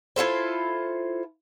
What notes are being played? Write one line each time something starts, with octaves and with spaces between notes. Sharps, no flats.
E4 F4 A4 C5